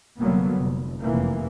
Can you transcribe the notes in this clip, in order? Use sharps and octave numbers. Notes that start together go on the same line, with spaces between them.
F1 D3 F#3 G3 A#3 B3
F1
F1 F#2 E3 A#3